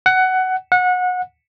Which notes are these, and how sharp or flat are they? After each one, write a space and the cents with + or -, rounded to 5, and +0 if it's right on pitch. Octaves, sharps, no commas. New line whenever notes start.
F#5 +15
F#5 -25